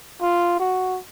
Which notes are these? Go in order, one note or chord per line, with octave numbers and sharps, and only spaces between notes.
F4
F#4